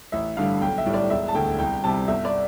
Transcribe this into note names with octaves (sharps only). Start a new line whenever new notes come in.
A1 E5
G2 D3 G3 F5
B1 G5
E5
A2 G3
D5
E1 E5
A5
D2 D3 A3 G5
C2 G5
C3 G3 A5
G1 E5
D5